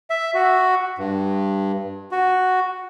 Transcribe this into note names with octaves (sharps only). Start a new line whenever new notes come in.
E5
F#4
G2
F#4